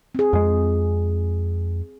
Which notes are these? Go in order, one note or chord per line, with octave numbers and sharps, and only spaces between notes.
C4 G#4
F2 G#3